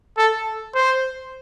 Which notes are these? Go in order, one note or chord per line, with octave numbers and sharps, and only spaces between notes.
A4
C5